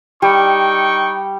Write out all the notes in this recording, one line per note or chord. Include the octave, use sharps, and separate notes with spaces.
G3 D#4 G5 C#6